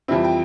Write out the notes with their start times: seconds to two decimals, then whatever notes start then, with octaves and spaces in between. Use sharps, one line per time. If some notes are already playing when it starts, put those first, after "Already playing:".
0.08 F2 E3 G3 C4 E5
0.24 G5